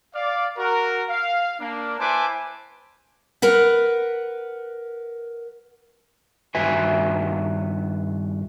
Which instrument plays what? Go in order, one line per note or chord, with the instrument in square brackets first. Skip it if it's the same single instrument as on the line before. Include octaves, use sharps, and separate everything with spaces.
[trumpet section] D5 F5
F#4 A#4
F5
A#3 D4
E4 B4 C5 G#5 A5 D6
[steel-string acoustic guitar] A#4 B4 F#5
[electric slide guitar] G2 D#3 F#4 B4 E5 G#5